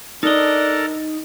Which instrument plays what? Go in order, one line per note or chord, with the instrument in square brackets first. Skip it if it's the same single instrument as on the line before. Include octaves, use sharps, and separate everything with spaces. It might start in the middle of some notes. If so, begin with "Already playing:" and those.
[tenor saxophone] D4 [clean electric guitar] D#4 D#5 [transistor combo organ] A4 A#4